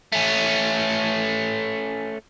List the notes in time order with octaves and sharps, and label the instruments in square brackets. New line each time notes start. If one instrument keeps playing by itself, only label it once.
[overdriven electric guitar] A3 C#4